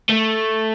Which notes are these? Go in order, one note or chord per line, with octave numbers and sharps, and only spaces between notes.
A3